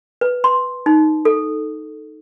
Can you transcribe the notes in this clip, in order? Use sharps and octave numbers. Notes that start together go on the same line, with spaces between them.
B4
C6
D#4
A4